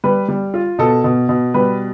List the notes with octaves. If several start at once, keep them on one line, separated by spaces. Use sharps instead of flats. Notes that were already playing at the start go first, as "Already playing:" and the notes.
G3 B4
G3
F4
B2 A4
B2
B2
G3 B4